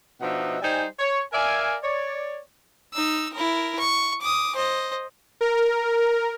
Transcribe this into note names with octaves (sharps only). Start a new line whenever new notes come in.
B2 F3 D4 D#4 E5 F#5
G3 D#4 C5 G#5
C#5
A#4 D5 E5 F5 G#5
C#5 D5
D#4 E6
E4 A#4
C#6
D6 D#6
C5 D#5
A#4